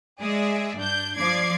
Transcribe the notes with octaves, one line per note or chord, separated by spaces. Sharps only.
G#3 G#4 D5 E5
G2 D4 G6
F3 D5 D6 G#6 C7